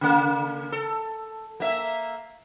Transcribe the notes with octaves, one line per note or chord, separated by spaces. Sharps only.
C#3 A#3
A4
A#3 E5